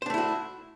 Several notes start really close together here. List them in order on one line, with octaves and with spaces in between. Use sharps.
C5 D4 A3 E4 F#4